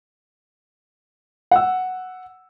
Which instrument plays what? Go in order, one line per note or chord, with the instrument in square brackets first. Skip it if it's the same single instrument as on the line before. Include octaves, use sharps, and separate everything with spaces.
[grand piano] F#5 E6